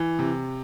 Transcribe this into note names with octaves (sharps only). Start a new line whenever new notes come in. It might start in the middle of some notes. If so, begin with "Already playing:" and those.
Already playing: E3
C3